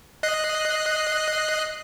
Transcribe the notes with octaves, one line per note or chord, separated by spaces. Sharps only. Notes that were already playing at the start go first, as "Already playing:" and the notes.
D#5 F#6 C7